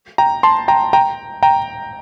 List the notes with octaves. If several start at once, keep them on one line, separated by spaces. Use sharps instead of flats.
G5 A#5
A5 C6
G5 A#5
G5 A#5
G5 A#5